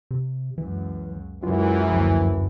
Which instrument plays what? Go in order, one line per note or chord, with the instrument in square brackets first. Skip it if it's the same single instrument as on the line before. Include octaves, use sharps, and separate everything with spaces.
[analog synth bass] C3
[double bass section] C#2 F#2 [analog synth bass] E3
[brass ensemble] F#2 E3 [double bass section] C#3 F#3 G#3 [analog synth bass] F4
[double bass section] F#1 D2 G2 [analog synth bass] F3